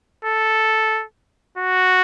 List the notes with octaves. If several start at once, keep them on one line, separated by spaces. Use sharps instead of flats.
A4
F#4